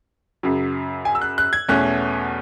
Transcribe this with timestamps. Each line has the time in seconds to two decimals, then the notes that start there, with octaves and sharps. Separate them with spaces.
0.43 F#2 C#3 F#3
1.05 G#5
1.15 E6
1.22 F#6
1.38 F#6
1.53 G#6
1.68 E2 B2 A3 C#4 F#6